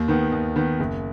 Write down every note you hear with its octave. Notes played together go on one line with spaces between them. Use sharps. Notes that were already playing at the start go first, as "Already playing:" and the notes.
Already playing: D#2
D#3 B3
D#2
D#3 B3
F#1